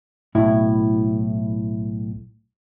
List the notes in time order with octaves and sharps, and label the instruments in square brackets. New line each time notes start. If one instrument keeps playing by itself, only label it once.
[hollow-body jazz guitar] B1 A2 E4